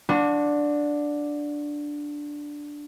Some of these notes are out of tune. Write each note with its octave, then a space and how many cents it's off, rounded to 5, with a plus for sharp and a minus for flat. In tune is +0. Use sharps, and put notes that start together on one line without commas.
D4 +0 F#4 -35